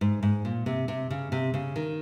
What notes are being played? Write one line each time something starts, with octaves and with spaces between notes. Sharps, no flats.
G#2
G#2
A#2
C3
C3
C#3
C3
C#3
D#3